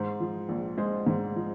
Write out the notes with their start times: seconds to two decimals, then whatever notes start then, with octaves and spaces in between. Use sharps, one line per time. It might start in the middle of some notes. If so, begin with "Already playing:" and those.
Already playing: G#2 C5
0.20 F3
0.49 A#1
0.78 G#3 C5
1.07 G#2
1.36 F3